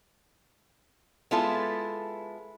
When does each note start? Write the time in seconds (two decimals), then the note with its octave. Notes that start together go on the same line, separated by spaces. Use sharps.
1.31 G#3 B3 E4 F4 A4